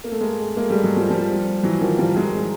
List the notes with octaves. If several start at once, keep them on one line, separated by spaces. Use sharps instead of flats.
A#3
A3
G#3 A#3
G#3 A#3
G3 A3
F#3 G#3
F3 G3
F3 G3
E3 F#3
D#3 F3
F3 G3
F#3 G#3